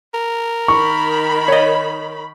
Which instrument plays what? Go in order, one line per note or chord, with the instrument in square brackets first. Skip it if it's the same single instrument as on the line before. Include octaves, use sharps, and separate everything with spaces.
[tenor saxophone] A#4
[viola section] D#3 B5 [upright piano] C#6
[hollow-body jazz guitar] C#5 D#5